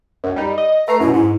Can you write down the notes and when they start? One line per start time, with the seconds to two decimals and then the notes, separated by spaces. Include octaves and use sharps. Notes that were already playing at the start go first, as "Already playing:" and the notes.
0.24 C#2 F#2
0.36 G3 D#4
0.58 D#5
0.88 A3 B4 A#5 C7
1.00 F#2 B2 E4
1.13 G#2 E4